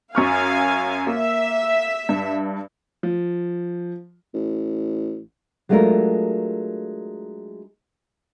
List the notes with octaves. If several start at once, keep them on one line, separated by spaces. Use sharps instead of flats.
F#2 F5 G#5 C#6 F6
A#3 E5
G2
F3
A1
F#3 G#3 A3 D4 F4 A#4